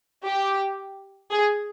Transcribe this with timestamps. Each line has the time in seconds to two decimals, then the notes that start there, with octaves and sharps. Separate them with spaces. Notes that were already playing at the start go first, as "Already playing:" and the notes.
0.25 G4
1.31 G#4